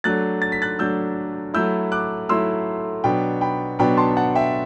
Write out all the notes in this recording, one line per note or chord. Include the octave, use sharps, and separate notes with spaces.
F#3 A3 D4 F#6 A6
A6
B6
F#6 A6
F#3 A3 D4 E6 G6
F#3 A3 E4 E6 G6
D6 F#6
F#3 A3 E4 C6 E6
B2 F#3 B3 D4 G5 B5
G5 B5
B2 F#3 B3 D4 G5 B5
A5 C6
F#5 A5
E5 G5